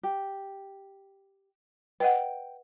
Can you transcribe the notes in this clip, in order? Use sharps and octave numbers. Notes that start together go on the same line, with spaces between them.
G4
B4 D#5 F#5 G5